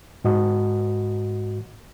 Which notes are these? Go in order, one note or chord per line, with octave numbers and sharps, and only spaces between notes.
G#2 F#4 D#5